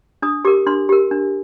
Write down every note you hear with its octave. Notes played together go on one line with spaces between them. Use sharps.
D4 D#6
G4 A#4 D6
D4 C6
G4 A#4
D4